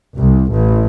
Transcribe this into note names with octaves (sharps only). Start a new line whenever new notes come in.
C2
A1